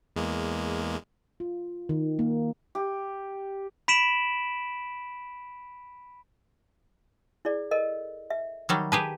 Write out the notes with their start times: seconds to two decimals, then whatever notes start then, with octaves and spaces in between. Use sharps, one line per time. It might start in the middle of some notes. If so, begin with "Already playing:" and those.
0.16 E2 G#3 A#3
1.40 F4
1.89 D#3
2.19 A#3
2.75 G4
3.88 B5 B6 D7 E7 F#7
7.45 E4 G#4 D5
7.71 A4 A#4 D#5
8.30 E5
8.69 D#3 F#3 G3
8.92 G4 G#4 B4 A5 A#5